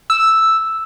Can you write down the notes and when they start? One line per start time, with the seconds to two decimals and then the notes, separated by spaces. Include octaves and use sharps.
0.10 E6